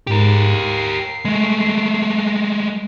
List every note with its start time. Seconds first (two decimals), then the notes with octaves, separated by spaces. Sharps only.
0.07 G#2 G4 A#4
0.64 C7
1.25 G#3 A3